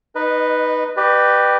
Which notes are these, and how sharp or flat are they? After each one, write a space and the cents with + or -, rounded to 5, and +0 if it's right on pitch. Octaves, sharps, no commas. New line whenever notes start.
D#4 +5 B4 +0 D#5 -25
G4 -5 B4 +0 D5 +45